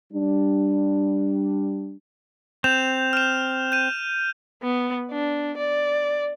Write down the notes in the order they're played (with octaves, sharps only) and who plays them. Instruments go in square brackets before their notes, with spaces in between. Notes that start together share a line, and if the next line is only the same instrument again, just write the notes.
[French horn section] G3 D4
[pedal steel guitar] C4 [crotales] G6 E7 F7
[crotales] F6 E7
G6 D#7
[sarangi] B3
D4
D5